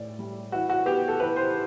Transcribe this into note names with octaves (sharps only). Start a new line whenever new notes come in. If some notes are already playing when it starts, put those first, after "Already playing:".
Already playing: A2 E3 D5
G3
E3 F#4
F#4
B3 G4
A4
E3 B4
C5